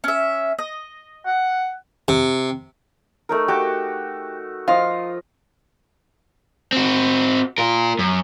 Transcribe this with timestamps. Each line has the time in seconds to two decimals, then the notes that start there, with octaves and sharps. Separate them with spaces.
0.04 C#4 E5
0.59 D#5
1.26 F#5
2.08 C3
3.29 A3 D#4 A#4
3.48 F#4 G4 G5 A5
4.68 F3 F4 D#5 F5
6.73 C4 F#4
7.58 F4 A#4
7.99 F#2